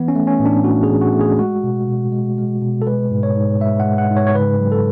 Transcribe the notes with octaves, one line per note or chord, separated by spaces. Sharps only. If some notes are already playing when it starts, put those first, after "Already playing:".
Already playing: E3 B3
C#4
A3
C#4
A2
D4
A2 F#4
G#4
E3
F#4
A3
G#4
G#3 F#4
B2
B2
G#3
G#3
B2
A4
G#3 B4
G#2
C#5
G#2
G#3 E5
F#5
G#3
F#5
G#2
C#5
C#5
C#3 B4
F#3
A4